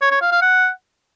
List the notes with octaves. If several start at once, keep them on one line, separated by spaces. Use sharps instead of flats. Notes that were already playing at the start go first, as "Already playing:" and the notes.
C#5
C#5
F5
F5
F#5